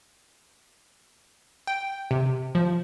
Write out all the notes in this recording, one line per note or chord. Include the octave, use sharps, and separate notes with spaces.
G5
C3
F3